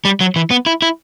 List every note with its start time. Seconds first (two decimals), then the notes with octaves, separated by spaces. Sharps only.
0.05 G3
0.21 F#3
0.36 E3
0.51 B3
0.66 E4
0.82 E4